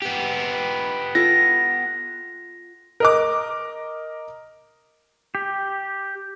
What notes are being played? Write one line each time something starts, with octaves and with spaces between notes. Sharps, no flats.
B3 G4
F4 A4 A#6
A#4 D#5 D6
G4